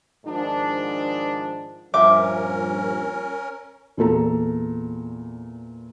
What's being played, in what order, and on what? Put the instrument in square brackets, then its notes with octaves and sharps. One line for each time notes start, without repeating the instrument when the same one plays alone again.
[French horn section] G#2 D#3 F3 D4
[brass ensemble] G2 A#2 F3 [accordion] C#4 A#4 [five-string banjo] E5 G5 [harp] D6
[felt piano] E2 A#2 A4 A#5